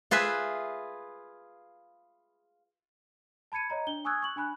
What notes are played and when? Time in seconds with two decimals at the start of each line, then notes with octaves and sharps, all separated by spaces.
0.11 F4 G#4 B4 E5
3.52 A5 B5 G#6 C#7 D#7
3.70 C#5 D#5 A#5
3.87 D4 G7
4.05 G#5 C#6 D#6 E6 F#6 G#6
4.22 C#6 F#7
4.36 D4 G#5 B5 F#6